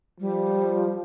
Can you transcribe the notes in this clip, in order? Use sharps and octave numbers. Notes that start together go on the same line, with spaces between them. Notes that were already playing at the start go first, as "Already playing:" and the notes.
F3 G3